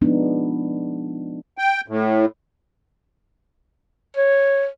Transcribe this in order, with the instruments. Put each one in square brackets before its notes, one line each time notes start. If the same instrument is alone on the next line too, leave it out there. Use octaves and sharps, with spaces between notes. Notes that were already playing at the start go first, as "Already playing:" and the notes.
[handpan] F3 G#3 B3 D4 D#4
[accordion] G5
A2
[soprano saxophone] C#5